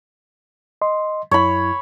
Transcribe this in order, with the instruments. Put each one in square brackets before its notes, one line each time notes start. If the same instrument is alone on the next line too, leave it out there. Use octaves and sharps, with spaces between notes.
[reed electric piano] D#5 C6
[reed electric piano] F#2 E4 [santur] C#5 B5